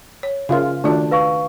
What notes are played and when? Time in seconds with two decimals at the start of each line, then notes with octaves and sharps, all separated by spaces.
0.23 C#5
0.49 C#3 F4 A#4 E5
0.84 D#3 A3 D4 F4 F#4
1.11 B4 F5 C#6